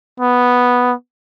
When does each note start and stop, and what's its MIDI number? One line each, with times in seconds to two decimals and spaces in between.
0.20 0.93 59